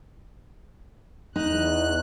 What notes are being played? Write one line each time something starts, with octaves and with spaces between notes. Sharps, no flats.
E2 D#4 F#6